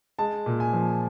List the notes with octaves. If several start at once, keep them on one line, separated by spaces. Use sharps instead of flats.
G#3 A5
A#2
G#5
F3